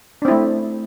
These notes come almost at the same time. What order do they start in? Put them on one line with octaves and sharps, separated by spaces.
D4 C4 E4 A3